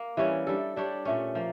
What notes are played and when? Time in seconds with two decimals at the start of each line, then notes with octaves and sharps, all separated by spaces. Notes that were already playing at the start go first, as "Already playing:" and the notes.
Already playing: A#3
0.17 E3 G3 C#4
0.47 G3 D4 A4
0.76 G3 D4 G4 C#5
1.05 A#2 A3 C#4
1.35 F3 A#3